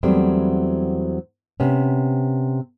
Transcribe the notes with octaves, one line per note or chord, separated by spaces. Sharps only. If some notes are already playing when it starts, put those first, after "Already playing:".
E2 F#3 G3 A3 B3 C4
C3 B3 C#4